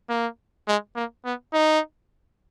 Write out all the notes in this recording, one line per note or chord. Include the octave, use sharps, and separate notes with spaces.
A#3
G#3
A#3
B3
D#4